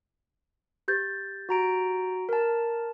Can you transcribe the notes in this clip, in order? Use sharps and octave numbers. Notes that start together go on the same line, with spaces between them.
G4 G6 A6
F#4 A#5 D7
A#4 A5